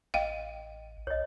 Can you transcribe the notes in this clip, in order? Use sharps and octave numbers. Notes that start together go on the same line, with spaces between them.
A1 D#5 F5 G5
B1 C#5 D#5